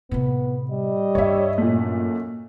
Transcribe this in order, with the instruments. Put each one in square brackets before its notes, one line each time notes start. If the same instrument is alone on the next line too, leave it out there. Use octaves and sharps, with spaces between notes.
[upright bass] A2 C3 [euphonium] B3
[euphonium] G3 [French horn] D#5
[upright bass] G2 D4 [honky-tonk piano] C#5 E5
[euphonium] F#2 [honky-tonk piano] A#2 A3